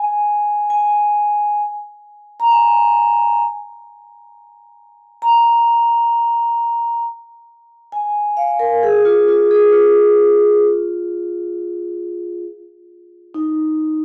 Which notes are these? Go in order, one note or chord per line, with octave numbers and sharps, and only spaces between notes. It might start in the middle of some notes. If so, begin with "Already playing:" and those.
Already playing: G#5
G#5
A#5
G#5
A#5
G#5
F5
A#4
G#4
F4
F4
G#4
F4
D#4